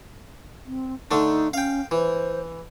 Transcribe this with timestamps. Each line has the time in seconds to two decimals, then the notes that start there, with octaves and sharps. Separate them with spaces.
0.66 C4
1.11 D3 A3 D4 D#4
1.53 C#4 F5 G5
1.91 E3 C5